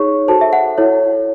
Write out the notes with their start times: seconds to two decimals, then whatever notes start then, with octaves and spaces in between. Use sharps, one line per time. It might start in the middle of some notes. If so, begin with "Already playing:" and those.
Already playing: D#4 G#4 C#5 C#6
0.28 F#4 A4 C5 A5
0.41 E5
0.53 F#5
0.78 E4 A4 C#5